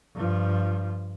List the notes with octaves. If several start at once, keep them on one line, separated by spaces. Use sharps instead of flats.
G2 F3